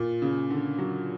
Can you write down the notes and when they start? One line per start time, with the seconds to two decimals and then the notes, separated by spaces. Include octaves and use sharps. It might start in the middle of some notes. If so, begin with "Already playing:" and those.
Already playing: A#2
0.22 C#3
0.50 D3
0.78 F#3